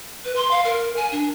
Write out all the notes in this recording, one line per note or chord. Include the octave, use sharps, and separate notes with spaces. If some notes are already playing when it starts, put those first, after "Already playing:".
B4
C6
F5
A#4
G#5
D4